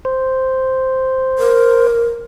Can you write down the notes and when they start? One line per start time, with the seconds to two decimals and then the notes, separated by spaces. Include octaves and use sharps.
0.05 C5
1.39 A#4